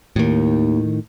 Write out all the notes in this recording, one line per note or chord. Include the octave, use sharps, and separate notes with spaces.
D#2 A2 D#3